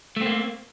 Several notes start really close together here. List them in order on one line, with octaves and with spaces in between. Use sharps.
A3 C4 A#3